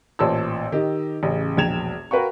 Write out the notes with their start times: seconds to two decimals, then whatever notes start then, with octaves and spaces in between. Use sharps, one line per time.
0.19 A1 A#2 C5 C#5 A5 E6
0.72 D#3 G4 D#5
1.23 A1 C#3
1.57 E1 A#1 G5 G#6 E7 F7
2.11 F#4 A#4 B4 F5 G5 C#6